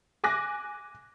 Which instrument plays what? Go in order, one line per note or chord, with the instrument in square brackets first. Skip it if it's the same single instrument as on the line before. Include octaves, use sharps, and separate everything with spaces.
[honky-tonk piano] G#5 D6 F#6 A#6